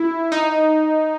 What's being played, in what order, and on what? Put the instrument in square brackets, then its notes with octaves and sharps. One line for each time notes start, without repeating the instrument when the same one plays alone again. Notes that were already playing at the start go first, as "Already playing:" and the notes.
Already playing: [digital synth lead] E4
D#4